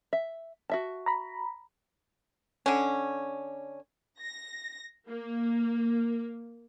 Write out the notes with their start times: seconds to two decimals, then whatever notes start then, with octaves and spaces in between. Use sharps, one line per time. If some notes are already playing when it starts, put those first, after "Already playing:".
0.13 E5
0.70 F#4 E5 A5
1.06 A#5 B5
2.66 D3 C#4
4.20 A#6
5.08 A#3